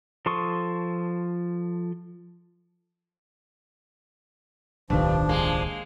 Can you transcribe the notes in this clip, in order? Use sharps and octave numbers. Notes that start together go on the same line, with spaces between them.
F3 A4 C6 C#6 D#6
D1 B1 G2 D#3 F3 D4
G#3 A#3